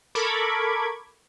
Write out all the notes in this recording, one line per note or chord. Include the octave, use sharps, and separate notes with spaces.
A4 A#4 B5 C#6 D6 G#6